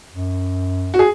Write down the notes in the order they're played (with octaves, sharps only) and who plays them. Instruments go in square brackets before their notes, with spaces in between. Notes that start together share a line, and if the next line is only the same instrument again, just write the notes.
[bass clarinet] F#2
[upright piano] F#4
G#4